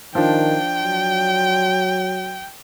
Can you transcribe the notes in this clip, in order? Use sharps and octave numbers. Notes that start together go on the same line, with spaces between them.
D#3 F3 D4 G5
F#3